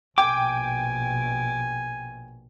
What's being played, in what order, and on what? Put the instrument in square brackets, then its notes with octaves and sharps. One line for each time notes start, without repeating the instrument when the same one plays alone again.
[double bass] A#1 B2 [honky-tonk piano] G5 [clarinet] G#5 [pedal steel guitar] D6